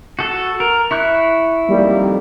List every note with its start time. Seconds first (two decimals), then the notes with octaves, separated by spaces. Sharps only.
0.19 F#4 A4
0.60 A#4
0.91 E4 C#6 F#6
1.69 F2 D#3 G3 A#3